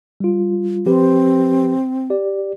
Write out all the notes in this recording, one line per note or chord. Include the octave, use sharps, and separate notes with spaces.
G3 F4
F3 C4 G4 B4
G4 D5